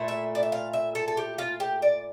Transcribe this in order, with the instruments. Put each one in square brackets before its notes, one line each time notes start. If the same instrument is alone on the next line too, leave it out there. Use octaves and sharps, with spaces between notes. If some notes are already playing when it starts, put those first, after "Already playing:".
Already playing: [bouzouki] A#2 A3 E4
E5
D5
E5
F5
E5
A4
A4
G4
F4
G4
D5